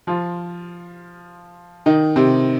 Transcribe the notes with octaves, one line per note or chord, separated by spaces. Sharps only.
F3 F4
D#3 D#4
C3 C4